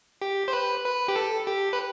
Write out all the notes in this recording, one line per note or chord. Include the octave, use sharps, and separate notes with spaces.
G4
C5
B4
B4
G4
A4
G4
B4